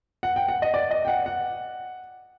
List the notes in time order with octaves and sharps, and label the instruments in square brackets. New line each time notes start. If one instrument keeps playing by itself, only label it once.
[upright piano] F#5
G5
F#5
D#5
D5
D#5
G5
F#5
F#5